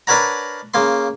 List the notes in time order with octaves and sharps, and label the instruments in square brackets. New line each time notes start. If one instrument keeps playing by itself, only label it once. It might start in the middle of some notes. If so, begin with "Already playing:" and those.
[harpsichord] D4 A#4 B4 C#5 F#5 A#5
C#3 A#3 C6